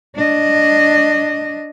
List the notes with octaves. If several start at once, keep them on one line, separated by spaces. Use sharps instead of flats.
D4 D#5